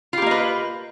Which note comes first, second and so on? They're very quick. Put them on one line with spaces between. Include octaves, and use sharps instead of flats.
F4 G4 A#3 D#5 B4